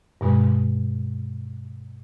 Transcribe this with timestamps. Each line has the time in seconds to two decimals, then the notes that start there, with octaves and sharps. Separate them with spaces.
0.21 G2 B2 G#3